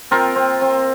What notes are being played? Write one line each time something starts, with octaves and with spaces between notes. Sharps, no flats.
C4 F4 A#4
C4
C4